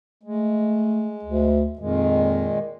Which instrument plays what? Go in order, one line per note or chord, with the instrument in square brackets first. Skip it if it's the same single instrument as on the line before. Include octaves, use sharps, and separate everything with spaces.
[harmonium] G#3 [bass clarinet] A3
[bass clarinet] D2
[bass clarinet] F2 [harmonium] A#2 D#3 G#3